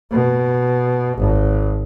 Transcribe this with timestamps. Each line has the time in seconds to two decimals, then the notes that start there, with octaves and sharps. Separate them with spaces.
0.12 B2
1.18 G#1